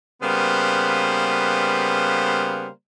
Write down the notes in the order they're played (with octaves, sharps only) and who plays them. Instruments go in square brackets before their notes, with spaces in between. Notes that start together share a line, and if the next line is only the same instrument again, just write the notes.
[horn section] C#3 G3 A#3 B3 B4 C5